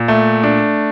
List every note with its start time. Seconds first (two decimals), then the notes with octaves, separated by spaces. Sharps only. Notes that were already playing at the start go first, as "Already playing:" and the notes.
Already playing: A#2
0.08 A3
0.43 D4